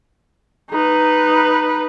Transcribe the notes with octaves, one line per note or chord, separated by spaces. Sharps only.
D#4 B4